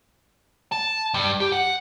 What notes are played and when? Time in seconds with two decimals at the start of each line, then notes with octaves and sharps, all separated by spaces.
0.72 A5
1.14 G2
1.40 G4
1.52 F#5